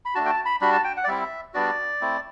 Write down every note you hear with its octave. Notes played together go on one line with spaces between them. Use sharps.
B5
A3 D4 F#4 A5
G5
A5
B5
G3 D4 F#4 B5
A5
G5
F#5
D5
G3 C4 E4 E5
G3 B3 D4 F#4 D5
A3 C4 E4